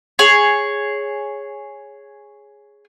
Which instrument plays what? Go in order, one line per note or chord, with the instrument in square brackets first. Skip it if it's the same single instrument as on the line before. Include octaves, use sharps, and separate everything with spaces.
[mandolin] G#4 C#5